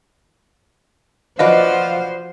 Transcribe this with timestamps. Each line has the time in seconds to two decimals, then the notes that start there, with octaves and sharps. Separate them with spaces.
1.39 F3 F4 F#4 B4 C5 D5 D#5